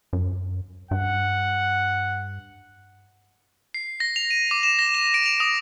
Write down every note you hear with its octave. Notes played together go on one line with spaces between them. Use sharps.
F#2
G2 F#5
C7
A#6
F7
D#7
D6
E7
A#6
E7
D7
F7
D#6